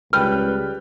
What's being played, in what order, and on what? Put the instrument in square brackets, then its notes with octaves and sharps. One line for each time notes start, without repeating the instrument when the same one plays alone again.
[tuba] C#2 [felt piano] G3 G5 G6 [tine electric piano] B4 [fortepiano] F6